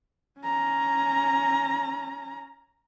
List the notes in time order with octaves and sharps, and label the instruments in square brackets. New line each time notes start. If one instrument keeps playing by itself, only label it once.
[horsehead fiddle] C#4 A#5